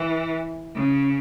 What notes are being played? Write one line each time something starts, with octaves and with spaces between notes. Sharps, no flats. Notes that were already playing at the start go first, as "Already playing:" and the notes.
Already playing: E3
C#3